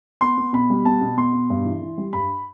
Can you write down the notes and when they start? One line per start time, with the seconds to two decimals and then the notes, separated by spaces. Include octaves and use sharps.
0.21 B3 C6
0.38 B3
0.53 B2 B5
0.70 G3
0.85 B3 A5
1.01 B2
1.18 B3 C6
1.33 B2
1.50 G2
1.65 E3
1.82 E3
1.98 G3
2.13 G2 B5